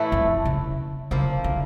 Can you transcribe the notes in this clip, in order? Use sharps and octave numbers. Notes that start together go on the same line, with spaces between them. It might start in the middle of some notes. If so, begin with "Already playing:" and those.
Already playing: A2 E3 A3 E4
F2
C#3
C#3 F3 A#3 E4
D3